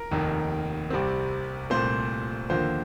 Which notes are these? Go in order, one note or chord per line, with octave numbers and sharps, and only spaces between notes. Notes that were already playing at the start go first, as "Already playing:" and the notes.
Already playing: A#4
F1 D#2 D#3
C2 C3 G3 C4
C2 A#2 A3 C4 C5
D#2 D3 F3 A#3 C5